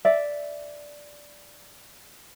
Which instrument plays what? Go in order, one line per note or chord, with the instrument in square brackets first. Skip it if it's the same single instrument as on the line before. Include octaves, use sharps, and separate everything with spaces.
[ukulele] D5 E5